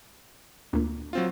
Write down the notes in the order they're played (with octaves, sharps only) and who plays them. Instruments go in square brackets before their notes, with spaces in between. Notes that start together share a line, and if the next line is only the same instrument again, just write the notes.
[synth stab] D2 A#2
[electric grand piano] F#3 C4 F4